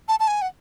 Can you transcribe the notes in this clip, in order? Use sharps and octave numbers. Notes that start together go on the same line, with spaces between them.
A5
A5
G#5
F#5